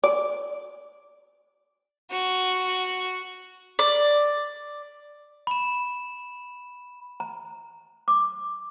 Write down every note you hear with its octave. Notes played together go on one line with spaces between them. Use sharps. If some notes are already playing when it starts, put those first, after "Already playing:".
D5
F#4
D5
B5 E7
A#5
D6